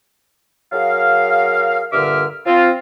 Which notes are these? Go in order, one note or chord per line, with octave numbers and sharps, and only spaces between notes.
F#3 G#4 A#4 F5
G2 A#2 D3 E5 D6 F6
F3 C4 F4